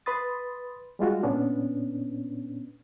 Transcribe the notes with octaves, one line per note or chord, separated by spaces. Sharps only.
B4 B5 C6 D#6 A6
G3 G#3 F4 F#4
A#2 B3 C#4 D4